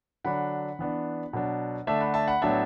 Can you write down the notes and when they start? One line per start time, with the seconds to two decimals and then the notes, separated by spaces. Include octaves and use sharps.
0.24 D3 F#3 D4 F#5 B5
0.79 E3 B3 D4
1.33 B2 F#3 D4
1.87 D3 A3 D4 E5 A5
2.01 F#5 B5
2.14 E5 A5
2.28 F#5 B5
2.42 A2 F#3 B3 D4 E5 A5